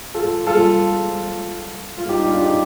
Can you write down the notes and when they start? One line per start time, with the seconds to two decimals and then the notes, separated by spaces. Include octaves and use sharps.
0.14 F4 A4
0.47 F4 A4
1.98 F4
2.09 D#4 G4
2.25 D4 F4
2.41 D#4 G4